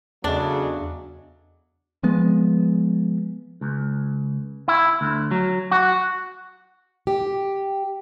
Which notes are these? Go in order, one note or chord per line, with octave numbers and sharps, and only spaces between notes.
E2 C#3 F#3 A3 D4 F#4 D#5
F3 G#3 B3
C#2
E4
D2
F#3
F#4
G4